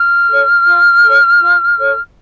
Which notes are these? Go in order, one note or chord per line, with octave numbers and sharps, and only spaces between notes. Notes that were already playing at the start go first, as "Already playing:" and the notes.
Already playing: F6
A4 C#5
F4
A4
C#5
F4
A4 C#5